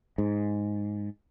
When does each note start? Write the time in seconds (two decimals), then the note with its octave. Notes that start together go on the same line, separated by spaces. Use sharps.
0.18 G#2